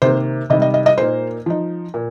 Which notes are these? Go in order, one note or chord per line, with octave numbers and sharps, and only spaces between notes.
C3 D#3 A#3 C5
C3 D#3 G3 D#5
D#5
D#5
D#5
A#2 A#3 D#4 C5
F3 D#4
A#2